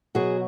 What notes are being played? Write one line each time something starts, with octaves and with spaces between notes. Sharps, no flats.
B2 F#3 F#4 G#4